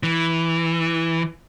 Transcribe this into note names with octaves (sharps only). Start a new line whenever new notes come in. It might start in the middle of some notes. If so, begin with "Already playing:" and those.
E3